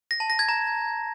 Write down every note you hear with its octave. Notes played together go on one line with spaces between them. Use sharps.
A#6
A5
A#6
G#6
A#5